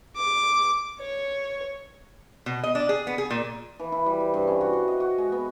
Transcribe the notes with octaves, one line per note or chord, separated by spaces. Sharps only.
D6
C#5
B2
D#5
D4
G#4
B3
G#4
A#2
E3
E4
G3
C5
G2
C#4
F#4
C6
D#5
F#4
G#3
B3